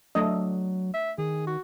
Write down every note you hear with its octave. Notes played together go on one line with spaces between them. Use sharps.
F#3 A3 D4 D#5
E5
D#3 G#4
F#4